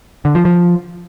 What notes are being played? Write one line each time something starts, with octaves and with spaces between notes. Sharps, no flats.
D3
F3
F3